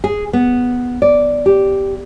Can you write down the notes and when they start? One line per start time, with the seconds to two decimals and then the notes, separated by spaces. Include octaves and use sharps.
0.04 G#4
0.33 B3
1.02 D5
1.46 G4